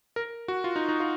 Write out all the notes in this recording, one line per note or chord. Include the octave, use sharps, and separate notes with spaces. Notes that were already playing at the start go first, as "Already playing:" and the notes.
A#4
F#4
F4
D#4
D#4
F4